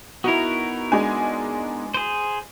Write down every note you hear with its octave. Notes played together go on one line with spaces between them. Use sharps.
B3 D#4 E4 F#4 A#4
G#3 D4 G#5
G#4 C5